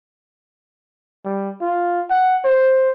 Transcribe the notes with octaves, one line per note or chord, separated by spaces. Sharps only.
G3
F4
F#5
C5